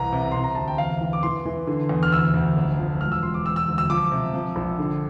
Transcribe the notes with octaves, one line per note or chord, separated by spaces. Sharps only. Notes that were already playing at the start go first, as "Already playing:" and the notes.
Already playing: C2 E3 A#5
C3
C3 C6
A#5
D2 A5
G5
E2 F5
E3
D6
E3 C6
E3
D3
E2
F6
D2 E6
D2
F1
F3
E1 F6
E6
F3 C6
D6
E1 E6
E6
D2
E6
F3 D6
C3
F3
A#1
D3